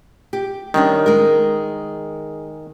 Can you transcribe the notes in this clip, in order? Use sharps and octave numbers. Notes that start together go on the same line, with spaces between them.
G4
D#3 G3 C#4 D4
G#3 A#4